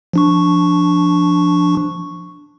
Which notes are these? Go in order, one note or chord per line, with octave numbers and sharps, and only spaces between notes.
F3 D4 C#6